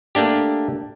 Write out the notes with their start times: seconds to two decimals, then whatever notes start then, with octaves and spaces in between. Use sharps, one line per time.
0.15 A3 A#3 D4 G4